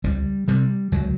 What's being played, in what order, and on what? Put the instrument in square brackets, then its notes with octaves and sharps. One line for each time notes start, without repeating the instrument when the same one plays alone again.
[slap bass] C#2 G3
C3 G3
C#2 F#3